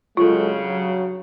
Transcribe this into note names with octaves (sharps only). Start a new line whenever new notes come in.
G2 C#3 F#3 G#3 F4 A4
F#3